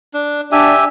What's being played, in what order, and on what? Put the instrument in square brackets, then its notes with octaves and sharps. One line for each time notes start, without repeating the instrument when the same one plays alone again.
[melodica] D4
[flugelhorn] D4 [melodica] G4 E5 G#5